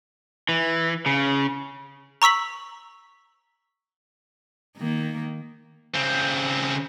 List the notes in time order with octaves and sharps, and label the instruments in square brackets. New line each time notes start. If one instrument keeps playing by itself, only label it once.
[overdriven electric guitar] E3
C#3
[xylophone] A#5 C#6 E6 B6 F#7
[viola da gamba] D#3 A#3
[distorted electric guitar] C#3 C4